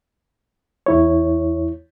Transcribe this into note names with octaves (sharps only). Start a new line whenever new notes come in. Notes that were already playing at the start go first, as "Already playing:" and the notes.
E2 E4 C#5